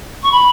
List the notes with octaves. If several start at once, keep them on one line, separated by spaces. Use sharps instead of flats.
C#6
B5